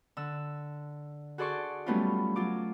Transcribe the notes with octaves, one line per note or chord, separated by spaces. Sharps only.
D3 E6
F#4 G#4 A4 D5 C6 C#6
F#3 G3 A3 B3 C#4 F4
F#3 F4 D6